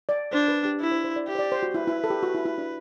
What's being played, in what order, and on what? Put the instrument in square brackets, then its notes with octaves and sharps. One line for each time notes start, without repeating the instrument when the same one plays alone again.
[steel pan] D5
[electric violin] D4 [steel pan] C5
[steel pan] B4
G4
[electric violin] E4 [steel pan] D5
[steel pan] C5
C5
D5
[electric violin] G4 [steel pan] E5
[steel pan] C5
D5
C5
F#4
[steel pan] E4 [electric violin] B4
[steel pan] E4
A4
G4
F#4
E4
E4
D4